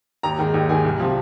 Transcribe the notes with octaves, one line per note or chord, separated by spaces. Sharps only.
D#2 A#5
D#3 G#3
D#2
D#3 G#3 G#5
C2
C3 F3